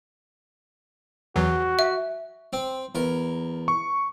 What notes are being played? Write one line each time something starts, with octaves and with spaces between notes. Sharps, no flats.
E2 E3 F#3 F#4
E5
C4
E2 A#4
C#6